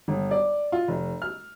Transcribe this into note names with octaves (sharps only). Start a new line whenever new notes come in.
G1
D5
F4
F1
F6